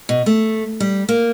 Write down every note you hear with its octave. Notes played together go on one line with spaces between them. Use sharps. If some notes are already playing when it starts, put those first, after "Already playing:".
B2
A3
G3
A#3